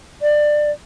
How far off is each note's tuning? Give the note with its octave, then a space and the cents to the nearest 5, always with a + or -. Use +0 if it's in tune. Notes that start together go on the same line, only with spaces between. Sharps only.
D5 +20